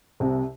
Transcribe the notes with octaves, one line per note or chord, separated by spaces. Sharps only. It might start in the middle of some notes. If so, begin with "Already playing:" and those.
C2 C3